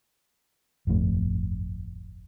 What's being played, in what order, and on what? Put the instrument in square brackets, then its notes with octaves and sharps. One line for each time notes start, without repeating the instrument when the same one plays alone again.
[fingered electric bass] D1 G1 F2 A3